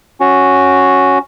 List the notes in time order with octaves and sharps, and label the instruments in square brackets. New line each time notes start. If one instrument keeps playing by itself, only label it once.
[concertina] C#4 F#4